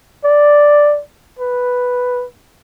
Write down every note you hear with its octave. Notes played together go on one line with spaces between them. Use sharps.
D5
B4